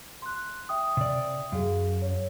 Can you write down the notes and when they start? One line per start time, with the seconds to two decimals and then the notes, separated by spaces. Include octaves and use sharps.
0.22 C6 F#6
0.69 E5 G5 D#6
0.97 C3 D5
1.52 F#2 G#4 F5
2.02 C#5